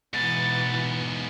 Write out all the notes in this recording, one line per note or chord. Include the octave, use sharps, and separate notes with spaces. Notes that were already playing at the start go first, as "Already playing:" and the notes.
G#2 B2 E3 B3 A6